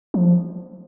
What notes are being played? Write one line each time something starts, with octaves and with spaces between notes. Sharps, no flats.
F3